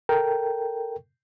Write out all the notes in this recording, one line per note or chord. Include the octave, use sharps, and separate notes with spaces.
A4 A#4 G5